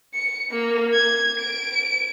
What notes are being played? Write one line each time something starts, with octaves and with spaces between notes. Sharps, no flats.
C#7
A#3
G#6
D7